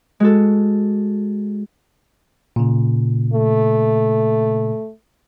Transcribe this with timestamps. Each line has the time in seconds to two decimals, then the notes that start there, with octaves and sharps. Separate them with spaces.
0.20 G#3 F#4 A4
2.56 A#2 C#3
3.33 A3